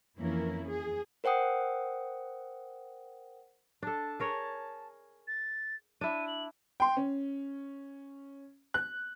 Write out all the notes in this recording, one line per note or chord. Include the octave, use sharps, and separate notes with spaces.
F2 E3 A#3 C#4 E4 A#4
G#4
A#4 C5 F#5 G5 D#6
D4 A4 A5
G#4 A#4 C#5
A6
D4 E4 D#7
F#7
G5 C6
C#4
F#6